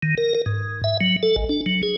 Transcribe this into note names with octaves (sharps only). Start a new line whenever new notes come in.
D#3
A#4
A#4
G#2
E5
F#3
A4
G#1
D4
F#3
G#4